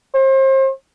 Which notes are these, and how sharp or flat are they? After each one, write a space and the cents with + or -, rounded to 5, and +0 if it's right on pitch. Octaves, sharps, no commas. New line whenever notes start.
C5 +35